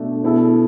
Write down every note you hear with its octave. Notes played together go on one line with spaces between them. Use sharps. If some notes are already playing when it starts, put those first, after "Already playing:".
Already playing: B2 A3 D4
B2 B3 E4 A4